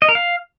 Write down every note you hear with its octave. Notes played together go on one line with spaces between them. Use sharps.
D#5
A#4
F5